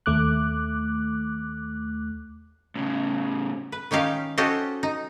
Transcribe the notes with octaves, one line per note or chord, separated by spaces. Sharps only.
D#2 A3 D6 F#6
A2 C#3
B4
D#3 C#4 D#4 G4 F5
C#4 F#4 G4 A4 C5 D#5
D#4